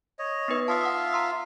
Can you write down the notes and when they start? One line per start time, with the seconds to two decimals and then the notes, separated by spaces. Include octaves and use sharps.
0.19 C#5 D#5
0.48 B3 D#4 B4
0.68 F4 E5 F5 A5 D#6 E6
0.81 F#5 D#6
1.13 A#5 C6 E6